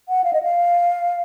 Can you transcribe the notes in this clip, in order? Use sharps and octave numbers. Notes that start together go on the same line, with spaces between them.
F#5
F5
D#5
F5